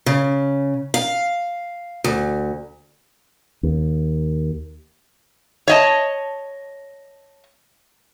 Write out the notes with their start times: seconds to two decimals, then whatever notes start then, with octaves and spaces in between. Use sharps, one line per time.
0.06 C#3
0.94 F5
2.04 D2
3.63 D#2
5.68 C#5 D#5 A5